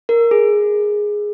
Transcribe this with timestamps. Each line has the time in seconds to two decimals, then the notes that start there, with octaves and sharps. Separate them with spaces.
0.09 A#4
0.31 G#4